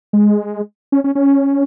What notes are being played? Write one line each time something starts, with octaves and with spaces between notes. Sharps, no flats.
G#3
C#4
C#4
C#4